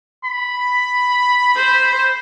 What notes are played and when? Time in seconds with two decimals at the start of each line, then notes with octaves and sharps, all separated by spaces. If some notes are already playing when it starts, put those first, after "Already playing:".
0.25 B5
1.55 C5